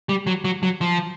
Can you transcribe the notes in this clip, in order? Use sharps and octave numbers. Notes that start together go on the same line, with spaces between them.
G3
F#3
F#3
F#3
F3